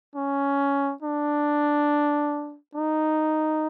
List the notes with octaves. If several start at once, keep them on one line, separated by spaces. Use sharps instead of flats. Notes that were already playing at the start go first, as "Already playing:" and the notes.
C#4
D4
D#4